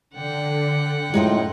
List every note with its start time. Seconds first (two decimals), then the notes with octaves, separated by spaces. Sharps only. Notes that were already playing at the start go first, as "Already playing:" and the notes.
0.14 D3 F#5 G5
1.14 F#2 A2 G#3 D#4 F4